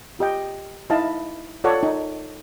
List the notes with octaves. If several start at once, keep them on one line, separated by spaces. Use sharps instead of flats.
F4 G4 D#5 G5
D#4 E4 D#5 F5 A5
F4 A4 C#5 D5 F#5
D#4